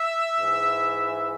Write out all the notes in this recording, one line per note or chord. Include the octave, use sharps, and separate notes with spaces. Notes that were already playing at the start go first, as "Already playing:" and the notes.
Already playing: E5
G#2 E3